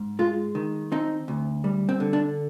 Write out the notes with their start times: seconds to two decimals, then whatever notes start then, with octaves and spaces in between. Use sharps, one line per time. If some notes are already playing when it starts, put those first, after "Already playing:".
Already playing: G#2
0.19 G#3 F4
0.55 D#3
0.92 C4 D#4
1.28 D2
1.64 G3
1.89 C4
2.00 D3
2.13 D4